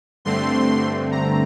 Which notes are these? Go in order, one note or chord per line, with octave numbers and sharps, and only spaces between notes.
G2 D3 A3 C4 C6
A#5